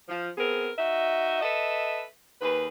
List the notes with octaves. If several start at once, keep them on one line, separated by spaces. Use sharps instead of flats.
F3
B3 C4 G#4 A#4
D#4 F#4 E5
A4 B4 D#5 E5
D#2 G#4 B4